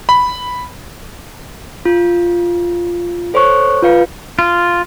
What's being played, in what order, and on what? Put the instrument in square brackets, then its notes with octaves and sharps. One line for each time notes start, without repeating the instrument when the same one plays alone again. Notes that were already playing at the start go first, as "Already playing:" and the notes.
[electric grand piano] B5
[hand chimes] F4
A4 C5 C#5 C#6 F#6
F4 B4 F5 C#7
[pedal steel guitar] F4